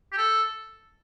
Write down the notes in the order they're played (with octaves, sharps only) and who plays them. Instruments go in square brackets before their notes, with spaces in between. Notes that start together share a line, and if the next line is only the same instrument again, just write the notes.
[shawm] G4
A4